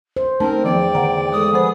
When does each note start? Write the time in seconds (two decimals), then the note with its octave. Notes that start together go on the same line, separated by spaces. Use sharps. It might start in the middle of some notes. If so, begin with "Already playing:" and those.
0.17 C5
0.40 A3 C4 C#4 D#4 A#4 A5
0.64 E2 D#3 F3 B3 D5 G5
0.95 D3 D#3 F#5 A#5
1.32 G#3 A4 D#6
1.51 F3 B3 G#4 C5